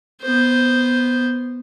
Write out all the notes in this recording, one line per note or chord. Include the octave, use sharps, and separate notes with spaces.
B3 C5